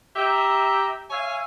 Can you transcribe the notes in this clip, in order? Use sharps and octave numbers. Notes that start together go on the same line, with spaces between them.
G4 E5 A#5
C#5 E5 F5 G#5